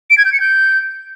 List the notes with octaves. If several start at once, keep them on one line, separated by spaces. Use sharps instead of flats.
D7
G#6
G6
C#7
G6